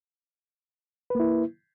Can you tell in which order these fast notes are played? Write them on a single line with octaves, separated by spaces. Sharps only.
B4 A#3 E4